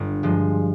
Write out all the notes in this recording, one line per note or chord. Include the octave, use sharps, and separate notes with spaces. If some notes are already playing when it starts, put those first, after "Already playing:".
Already playing: G1
G2 F3 G#3